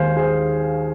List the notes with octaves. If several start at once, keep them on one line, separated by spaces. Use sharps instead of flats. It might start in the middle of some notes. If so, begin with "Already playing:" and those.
Already playing: D#2 D#3 G#3 C5 F5 G#5
G#4 C5